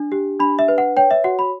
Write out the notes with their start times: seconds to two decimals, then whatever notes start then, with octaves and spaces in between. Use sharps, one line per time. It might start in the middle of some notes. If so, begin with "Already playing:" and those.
Already playing: D4
0.12 G4
0.40 D4 B5
0.59 E5
0.68 B4
0.78 F#5
0.97 C#5 G5
1.11 E5
1.24 F#4 F#5
1.39 B5